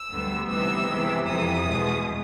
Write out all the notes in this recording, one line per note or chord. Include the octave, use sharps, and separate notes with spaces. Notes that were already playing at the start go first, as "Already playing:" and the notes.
Already playing: E6
D2 D3 G3 B3
C3 E3 G3 B3 D#4 E6
C3 E3 G#3
F2 C3 E3 D#6
E2 B2 G#3